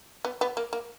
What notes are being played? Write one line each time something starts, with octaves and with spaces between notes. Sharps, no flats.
B3
B3
A#3
A#3